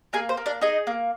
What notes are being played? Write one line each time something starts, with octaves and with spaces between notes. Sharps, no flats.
A#3 G#4 G#5
C5
A#3
D4 D5
D#4 G#4 D#5
A#3